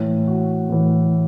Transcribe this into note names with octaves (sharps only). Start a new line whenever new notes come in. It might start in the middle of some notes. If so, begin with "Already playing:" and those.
Already playing: A2 E3
F#4
A2 E3